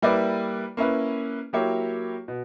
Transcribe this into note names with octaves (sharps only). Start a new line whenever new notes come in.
G3 A#3 E4 B4 D5
A#3 C#4 E4 B4
F#3 A#3 E4 G4 C#5
B2